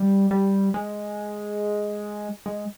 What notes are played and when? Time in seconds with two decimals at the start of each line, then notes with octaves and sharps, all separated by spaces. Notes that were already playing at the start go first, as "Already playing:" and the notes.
Already playing: G3
0.31 G3
0.74 G#3
2.46 G#3